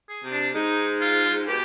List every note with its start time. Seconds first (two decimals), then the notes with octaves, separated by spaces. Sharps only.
0.09 G#4
0.24 C3
0.32 D4
0.54 G#2 D#4
1.01 F4
1.48 B2 G4